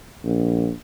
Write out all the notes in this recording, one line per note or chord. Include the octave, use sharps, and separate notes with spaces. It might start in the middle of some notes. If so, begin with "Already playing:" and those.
A#1